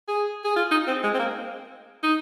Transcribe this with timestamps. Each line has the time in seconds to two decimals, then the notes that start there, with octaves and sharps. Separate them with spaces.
0.08 G#4
0.44 G#4
0.56 F4
0.71 D#4
0.87 C4
1.03 G#3
1.14 C4
1.19 A#3
2.03 D#4